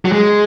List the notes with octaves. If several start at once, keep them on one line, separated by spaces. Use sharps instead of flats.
F#3
G#3